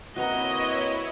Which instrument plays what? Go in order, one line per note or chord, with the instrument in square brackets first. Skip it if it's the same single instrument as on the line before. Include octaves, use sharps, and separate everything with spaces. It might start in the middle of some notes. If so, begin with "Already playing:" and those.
[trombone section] A#3 C4 B4 [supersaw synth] E4 C#5 [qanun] F#4 A#5 [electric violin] D#5